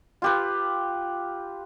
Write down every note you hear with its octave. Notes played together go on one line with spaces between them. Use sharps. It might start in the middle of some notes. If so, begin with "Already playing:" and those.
F4 G4 B4